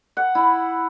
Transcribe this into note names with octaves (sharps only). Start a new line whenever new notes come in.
F#5
E4